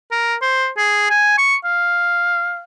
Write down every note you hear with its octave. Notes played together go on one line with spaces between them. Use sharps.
A#4
C5
G#4
G#5
C#6
F5